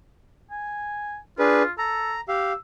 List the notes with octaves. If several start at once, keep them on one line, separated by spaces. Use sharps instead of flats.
G#5
D4 F4 G#4 B4
A4 A#5
G4 F5 E6